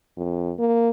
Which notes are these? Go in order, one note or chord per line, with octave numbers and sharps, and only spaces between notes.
F2
A#3